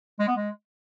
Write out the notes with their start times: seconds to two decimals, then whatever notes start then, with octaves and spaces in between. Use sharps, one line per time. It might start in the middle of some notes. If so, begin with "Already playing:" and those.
0.19 G#3
0.28 B3
0.36 G#3